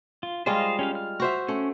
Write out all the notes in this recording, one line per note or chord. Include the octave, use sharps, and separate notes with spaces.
F4
G3 G#3 F4 C5 D#5 F5
C#4 G4 F5
F6
F#4 C5 E5
A3 C#4